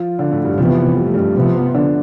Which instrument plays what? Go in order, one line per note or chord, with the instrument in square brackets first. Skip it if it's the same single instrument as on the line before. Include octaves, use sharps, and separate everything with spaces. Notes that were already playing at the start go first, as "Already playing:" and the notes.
Already playing: [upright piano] F3 F4
D3 D4
A2 A3
G2 G3
[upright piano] F2 F3 [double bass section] C3 E3 B3
[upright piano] G3
A3
G2 G3
[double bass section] C3 F3 B3
[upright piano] D3 D4